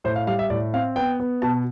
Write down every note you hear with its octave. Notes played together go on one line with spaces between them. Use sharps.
A2 C5
F5
G3 F5
E5
A2 D5
C4 F5
B3 G5
B3
B2 A5